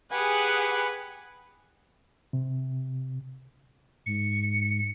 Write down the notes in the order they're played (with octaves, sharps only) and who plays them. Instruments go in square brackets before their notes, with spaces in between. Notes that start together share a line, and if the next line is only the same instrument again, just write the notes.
[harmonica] G4 B4 G#5 [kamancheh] G#4 F#5
[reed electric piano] C3
[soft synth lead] G#2 [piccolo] C#7